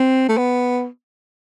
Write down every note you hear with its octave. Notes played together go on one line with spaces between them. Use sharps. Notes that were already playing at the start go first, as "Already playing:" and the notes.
Already playing: C4
A3
B3